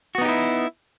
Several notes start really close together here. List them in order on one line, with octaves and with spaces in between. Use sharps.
F#4 B3 D#4 G4 E4